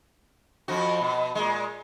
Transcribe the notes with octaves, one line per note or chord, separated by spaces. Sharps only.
F2 F3 F#4
B2
A#2 G#3